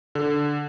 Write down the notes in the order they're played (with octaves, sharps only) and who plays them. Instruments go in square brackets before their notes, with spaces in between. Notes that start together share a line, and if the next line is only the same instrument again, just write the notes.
[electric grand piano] D3